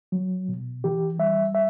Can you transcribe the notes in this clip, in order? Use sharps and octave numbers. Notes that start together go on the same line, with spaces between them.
F#3
B2
E3 G4
G3 E5
E5